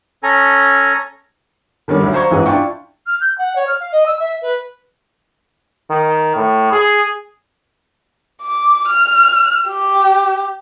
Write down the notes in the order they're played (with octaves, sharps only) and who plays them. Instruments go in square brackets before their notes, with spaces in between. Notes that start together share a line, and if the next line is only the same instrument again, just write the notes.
[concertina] C#4 A4 G#5 A#5
[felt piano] D3 D#3 G3 C#4
D2 F#3
C5 F5 A#5 C#6 G#6
A1 G#2 E3 G#4
D4 E4 F4 G5 C#6
[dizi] F6
G6
F#5
C#5
F6
F5
D#5
E6
E5
B4
[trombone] D#3
A2
G#4
[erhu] D6
F6
G4